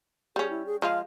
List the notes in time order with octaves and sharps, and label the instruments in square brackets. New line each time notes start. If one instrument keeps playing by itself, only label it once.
[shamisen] G3 C#4 [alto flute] G#4
[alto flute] E4
G#4
[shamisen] F3 G#3 F4 [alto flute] F5